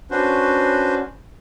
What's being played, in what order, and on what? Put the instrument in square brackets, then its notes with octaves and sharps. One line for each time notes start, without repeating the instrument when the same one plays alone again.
[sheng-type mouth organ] C#4 D4 F#4 B4 C5